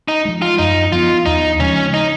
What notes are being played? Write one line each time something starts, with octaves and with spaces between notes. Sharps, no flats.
D#4
F3 G#3
F4
F#2 D#4
F3 B3 F4
D#2 D#4
C#3 F3 G#3 C#4
D#4